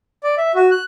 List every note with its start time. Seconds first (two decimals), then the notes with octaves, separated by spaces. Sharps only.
0.23 D5
0.38 E5
0.55 F#4
0.71 F#6